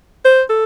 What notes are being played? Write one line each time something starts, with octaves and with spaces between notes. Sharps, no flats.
C5
A4